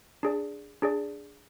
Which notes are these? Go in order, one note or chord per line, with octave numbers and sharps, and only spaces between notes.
D4 G#4 D5
D4 G#4 D5